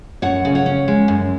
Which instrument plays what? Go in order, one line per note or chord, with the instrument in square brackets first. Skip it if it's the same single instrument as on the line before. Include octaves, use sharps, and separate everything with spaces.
[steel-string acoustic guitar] F#2 C#5 F#5
C#3
C#5 F#5
C#4
G#3
F#2